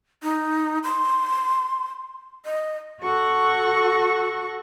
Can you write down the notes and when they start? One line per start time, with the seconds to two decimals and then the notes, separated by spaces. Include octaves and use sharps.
0.23 D#4
0.84 C6
2.45 D#5
3.02 F#4 A4 F#5 C#6